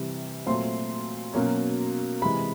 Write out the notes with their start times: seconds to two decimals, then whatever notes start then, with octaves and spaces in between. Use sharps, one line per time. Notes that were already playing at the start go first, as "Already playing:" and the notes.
Already playing: C3 E3 G3
0.46 A#2 F#3 A3 C4 C6
1.34 B2 F#3 A#3 C#4
2.22 C3 E3 G#3 B5